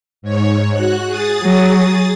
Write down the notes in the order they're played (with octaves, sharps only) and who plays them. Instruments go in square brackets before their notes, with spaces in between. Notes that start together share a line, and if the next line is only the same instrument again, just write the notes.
[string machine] G#2 C#5
F#4 F#6
G#4 D#6 A6
[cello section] F#3